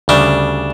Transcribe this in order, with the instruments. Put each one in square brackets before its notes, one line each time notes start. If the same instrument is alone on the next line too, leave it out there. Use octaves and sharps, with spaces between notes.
[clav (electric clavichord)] D2 C#3 G3 [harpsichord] D4